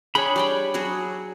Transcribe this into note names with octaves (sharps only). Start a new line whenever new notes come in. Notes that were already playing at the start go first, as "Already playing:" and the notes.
D4 G#4 C#5 G5 B5
G3 D5 G5
F#3 F#4 G#4